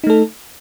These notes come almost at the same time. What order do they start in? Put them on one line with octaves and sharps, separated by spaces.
D#4 A3 A4